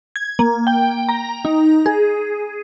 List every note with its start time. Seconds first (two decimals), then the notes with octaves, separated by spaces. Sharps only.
0.16 G#6
0.39 A#3
0.67 G5
1.09 A#5
1.45 D#4
1.86 G#4